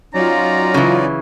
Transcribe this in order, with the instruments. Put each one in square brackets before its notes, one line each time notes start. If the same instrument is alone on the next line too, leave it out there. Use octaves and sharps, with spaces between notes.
[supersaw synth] F#3 F4 [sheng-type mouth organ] C#4 D#4 D5 [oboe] A#5
[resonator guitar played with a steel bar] C#3 E3